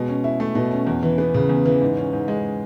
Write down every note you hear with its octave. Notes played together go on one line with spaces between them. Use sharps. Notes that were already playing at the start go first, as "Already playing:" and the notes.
Already playing: B2 G#3
C#4
E4
A3
B2
C#4
E2
E3
B3
C#3
E2
E3
G#2
C#4
G#2
G#3